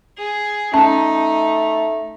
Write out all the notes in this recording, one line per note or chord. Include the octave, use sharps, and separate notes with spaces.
G#4
A3 C#4 D#4 A5